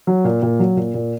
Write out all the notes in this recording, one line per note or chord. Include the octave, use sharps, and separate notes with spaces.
F#3
A#2
A#2
F#3
A#2
A#2